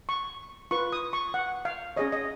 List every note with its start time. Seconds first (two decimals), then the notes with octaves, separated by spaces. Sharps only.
0.09 C#6
0.71 F4 B4 C#6
0.92 D#6
1.13 C#6
1.34 F#5
1.65 F5
1.96 C#4 G#4 C#5 D#5
2.12 D#5